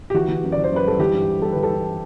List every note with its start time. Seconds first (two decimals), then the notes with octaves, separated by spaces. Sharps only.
0.10 G4
0.14 E3 F#4
0.28 E3
0.44 F#2
0.52 E3 D5
0.64 C5
0.72 F#2 B4
0.86 G3 A4
0.99 E3 G4
1.13 G2
1.28 G3
1.42 G3 A4
1.52 E3 B4
1.63 A4
1.70 E3